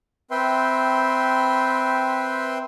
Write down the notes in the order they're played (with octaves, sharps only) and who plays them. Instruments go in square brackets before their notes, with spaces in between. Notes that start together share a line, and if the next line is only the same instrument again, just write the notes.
[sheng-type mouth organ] C4 B4 E5 G5 C6